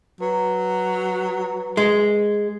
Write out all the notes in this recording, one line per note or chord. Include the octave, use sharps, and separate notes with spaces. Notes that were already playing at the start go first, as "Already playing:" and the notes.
F#3 B4
G#3